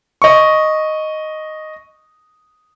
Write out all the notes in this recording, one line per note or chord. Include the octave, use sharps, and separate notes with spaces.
D#5 C#6